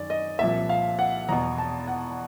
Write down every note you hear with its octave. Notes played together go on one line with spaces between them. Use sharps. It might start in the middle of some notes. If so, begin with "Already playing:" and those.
Already playing: F#2 D#3 D5
D#5
C2 A#2 F3 E5
F5
F#5
E2 B2 A#5
A5
F#5